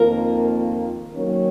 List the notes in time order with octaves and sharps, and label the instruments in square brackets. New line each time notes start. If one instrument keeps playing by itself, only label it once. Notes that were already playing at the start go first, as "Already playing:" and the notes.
Already playing: [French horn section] F2 D#3 A#3 F4 [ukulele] A#4
[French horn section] D#3 F#3 A#3 C#4